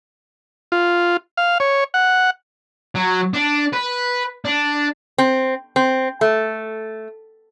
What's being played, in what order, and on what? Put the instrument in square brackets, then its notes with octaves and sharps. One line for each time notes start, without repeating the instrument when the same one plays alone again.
[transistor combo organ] F4
F5
C#5
F#5
[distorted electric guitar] F#3
D4
B4
D4
[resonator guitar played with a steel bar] C4
C4
A3